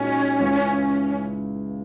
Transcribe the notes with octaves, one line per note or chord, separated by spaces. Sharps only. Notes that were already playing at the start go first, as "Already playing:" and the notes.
Already playing: A#2 G#3 C#4 D#4 F#4
C#2 C#3 E3